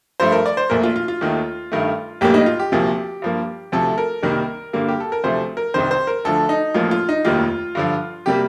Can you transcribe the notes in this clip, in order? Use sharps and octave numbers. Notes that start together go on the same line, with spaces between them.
G2 F3 A3 C5
A#4
D5
C5
A#1 A#2 A3 A#4
F4
F4
F4
D#2 D#3 A3
G2 D#3 A3
A#1 A2 G3 A#3 G4
D#4
F4
G4
D2 C3 F3 A#3
G2 F3 A#3
D2 C3 F3 A3 A4
A#4
C2 C3 D#3 G3 A#3
G2 D3 G3 A#3
G4
A4
A#4
D2 C3 F3 A3 C5
A#4
C2 C3 D#3 C5
C5
A#4
D2 D3 F3 A3 A4
D#4
A1 A2 F3 A#3 F4
F4
D#4
F1 D#2 D#3 G3 A#3 F4
G2 D3 F3
C3 G3 A#3 G4